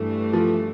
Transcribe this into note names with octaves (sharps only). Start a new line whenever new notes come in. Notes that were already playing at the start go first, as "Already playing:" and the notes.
Already playing: G2 E3 A3
F3